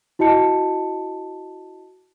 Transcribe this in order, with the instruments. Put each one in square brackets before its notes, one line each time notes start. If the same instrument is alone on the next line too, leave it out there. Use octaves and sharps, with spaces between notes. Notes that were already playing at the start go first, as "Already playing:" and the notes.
[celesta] E4 F#4 D#5 A5 C#7